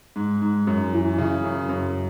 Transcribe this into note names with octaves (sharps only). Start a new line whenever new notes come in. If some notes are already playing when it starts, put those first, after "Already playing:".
G#2
G#2
F#2
E3
C#3
F#2
F#2